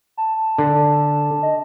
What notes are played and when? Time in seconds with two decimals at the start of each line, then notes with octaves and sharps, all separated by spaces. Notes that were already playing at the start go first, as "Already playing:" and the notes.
0.17 A5
0.58 D3
1.43 D#5